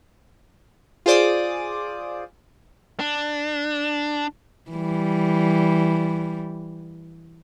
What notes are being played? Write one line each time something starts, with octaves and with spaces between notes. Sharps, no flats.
F4 G#4 C5 D5 D6 D#6
D4
E3 G3